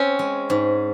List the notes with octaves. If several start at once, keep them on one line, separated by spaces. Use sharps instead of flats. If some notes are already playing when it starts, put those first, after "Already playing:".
Already playing: C4 C#4
G#3
G#2